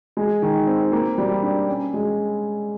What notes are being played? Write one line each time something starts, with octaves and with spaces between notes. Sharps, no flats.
G#3
D#3
C4
A#3
G3
D4
C#4
G#3